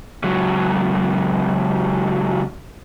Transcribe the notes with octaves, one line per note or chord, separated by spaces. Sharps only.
C#2 F#3